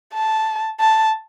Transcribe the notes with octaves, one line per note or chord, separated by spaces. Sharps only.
A5
A5